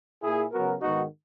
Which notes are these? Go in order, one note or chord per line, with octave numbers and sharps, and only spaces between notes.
A#2 A#3 E4 G#4
C#3 F#3 B3 F#4 A#4
G#2 D#3 G#3 B3 D#4 F#4